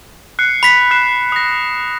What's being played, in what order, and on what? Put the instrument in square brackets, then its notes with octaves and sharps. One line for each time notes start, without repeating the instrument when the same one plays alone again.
[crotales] F#6 C7 C#7
[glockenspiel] B5 B6
[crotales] F#6 C7 E7
D#6 A#6